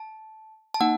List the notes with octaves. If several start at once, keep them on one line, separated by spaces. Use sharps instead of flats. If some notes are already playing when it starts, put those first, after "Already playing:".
Already playing: A5
A5
A#3 D#4 F#5